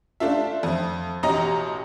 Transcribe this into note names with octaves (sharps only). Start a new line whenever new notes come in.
A3 D4 F4 E5
F2
A1 B2 G4 D#5 A#5